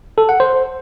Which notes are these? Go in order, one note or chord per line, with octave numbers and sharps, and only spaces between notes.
A4
F#5
C5